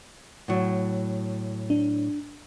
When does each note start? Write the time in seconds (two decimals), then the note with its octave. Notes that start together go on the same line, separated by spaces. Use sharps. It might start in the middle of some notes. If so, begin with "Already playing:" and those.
0.48 A2 F#3
1.70 D4